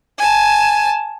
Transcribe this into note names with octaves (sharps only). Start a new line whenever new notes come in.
G#5 A5